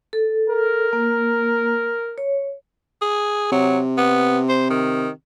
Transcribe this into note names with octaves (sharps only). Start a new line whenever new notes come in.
A4
A#4
A#3
C#5
G#4
C3 F#3
B3
C5
D#3